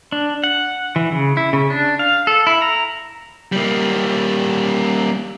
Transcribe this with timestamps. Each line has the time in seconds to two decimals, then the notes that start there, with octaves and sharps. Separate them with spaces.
0.12 D4
0.44 F#5
0.96 E3
1.12 C#3
1.37 E4
1.53 C#3
1.70 D4
1.99 F5
2.27 A4
2.47 E4
2.62 A#5
3.52 G3 A#3